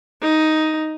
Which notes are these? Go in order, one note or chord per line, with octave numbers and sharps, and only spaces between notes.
D#4